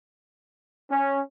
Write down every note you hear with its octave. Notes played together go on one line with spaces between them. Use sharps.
C#4